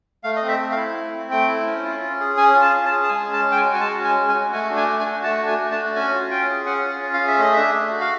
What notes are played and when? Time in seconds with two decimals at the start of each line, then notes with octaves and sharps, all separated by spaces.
0.24 A3 F5
0.36 D#5
0.42 C4
0.48 E5
0.59 A3
0.72 F5
0.77 E4
0.94 A3
1.13 C4
1.31 A3 G5
1.48 E4
1.67 C#4
1.84 F4
2.03 C#4
2.20 G#4
2.37 C#4 G#5
2.55 F4
2.61 A5
2.74 C#4
2.85 A5
2.92 G#4
3.04 A5
3.09 G#3 G#5
3.28 C#4
3.33 A5
3.45 G#3
3.52 G5
3.57 G#5
3.63 F#4
3.74 G#5
3.81 G#3 A5
3.99 C#4
4.04 G#5
4.17 G#3
4.28 G#5
4.34 F#4
4.52 A3 G#5
4.70 D4
4.76 G#5
4.88 A3
5.00 G#5
5.06 F#4
5.23 A3 A5
5.42 D4 G#5
5.59 A3
5.72 A5
5.78 F#4
5.96 C#4 G#5
6.14 F4
6.31 C#4 G5
6.49 G#4
6.66 C#4 F#5
6.84 F4
7.02 C#4
7.14 F5
7.20 G#4
7.28 E5
7.38 A3 D#5
7.53 D4 E5
7.74 A3
7.91 F#4
8.00 F5